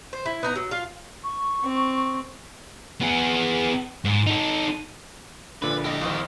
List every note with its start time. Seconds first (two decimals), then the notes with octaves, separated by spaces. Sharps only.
0.13 C5
0.26 E4
0.43 B3 D#4 A#5
0.55 F#3
0.71 F4 F5
1.24 C#6
1.64 C4
3.01 B3 G#4
4.05 G#2
4.26 D#4 A4
5.62 A#1 A#2 D3 B4 D5
5.84 A#1 E4 G4 D#5
6.01 F2 D#3 C5